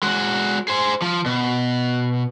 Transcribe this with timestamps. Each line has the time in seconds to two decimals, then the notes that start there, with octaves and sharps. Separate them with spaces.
0.03 G#3 F#4
0.68 G#4 C5
1.02 F3
1.26 B2